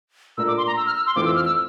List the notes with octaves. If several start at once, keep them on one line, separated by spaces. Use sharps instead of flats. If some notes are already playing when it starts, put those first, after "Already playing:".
A#2 A3 D4 F4 A#4 E6
D6
C6
A#5
E6
F6
E6
C6
F2 E3 A3 C4 F4 D6
E6
F6
E6